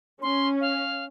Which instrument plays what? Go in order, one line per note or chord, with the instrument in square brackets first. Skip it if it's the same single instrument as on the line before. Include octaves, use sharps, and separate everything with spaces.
[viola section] C#4 [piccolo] C6
[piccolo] F5